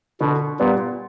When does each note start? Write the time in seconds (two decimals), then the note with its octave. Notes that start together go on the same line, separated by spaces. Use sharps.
0.20 B2 D3
0.60 A#2 G3 B3